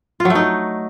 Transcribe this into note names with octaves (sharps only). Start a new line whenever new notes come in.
F4
F#3
A3
D#4